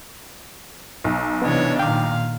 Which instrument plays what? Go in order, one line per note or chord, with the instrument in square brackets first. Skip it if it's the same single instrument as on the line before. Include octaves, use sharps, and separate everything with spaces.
[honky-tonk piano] B1
[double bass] C3 E3 [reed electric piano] B3 D#5 [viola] D4 C#5
[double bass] A#2 D#3 [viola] F5 [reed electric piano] G5 D6